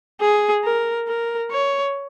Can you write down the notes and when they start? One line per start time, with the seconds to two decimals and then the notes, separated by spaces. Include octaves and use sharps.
0.21 G#4
0.64 A#4
1.08 A#4
1.51 C#5